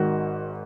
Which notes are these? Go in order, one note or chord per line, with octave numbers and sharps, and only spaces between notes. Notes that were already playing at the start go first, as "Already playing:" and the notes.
Already playing: G#1 G#2 D#3 F#4